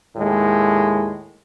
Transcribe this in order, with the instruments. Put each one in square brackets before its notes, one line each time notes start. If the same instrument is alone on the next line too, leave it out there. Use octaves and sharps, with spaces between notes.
[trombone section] D#2 A2 G#3